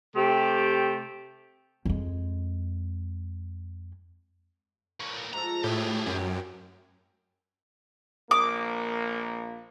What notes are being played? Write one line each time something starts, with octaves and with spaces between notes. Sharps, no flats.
C3 A3 G4
F2 G#3
A2 A#3 C#6
G#2 F3 A4 A#5
A2 G4 G#4
F#2 G5 G#5
A#1 A#3 D6 D#6